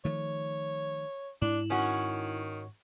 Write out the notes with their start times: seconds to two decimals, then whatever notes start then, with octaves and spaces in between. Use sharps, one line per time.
0.05 D#3 F3 A3 C#5
1.42 G#2 D4 E4 E7 F#7
1.70 D#3 C#4 F#4